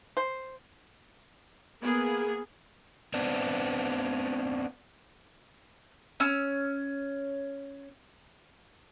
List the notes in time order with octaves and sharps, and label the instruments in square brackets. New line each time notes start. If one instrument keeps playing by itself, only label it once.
[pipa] C5
[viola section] A#3 B3 G#4
[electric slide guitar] B3 C4 D4
[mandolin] C#4 E6